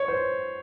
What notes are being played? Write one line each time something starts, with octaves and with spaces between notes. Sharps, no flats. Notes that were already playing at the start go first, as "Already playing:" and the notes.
Already playing: C#5
C5